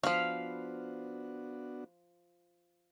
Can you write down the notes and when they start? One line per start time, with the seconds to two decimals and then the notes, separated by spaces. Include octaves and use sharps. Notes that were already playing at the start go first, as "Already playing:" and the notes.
0.03 F3 F#3 B3 D4 F#4 F5 B5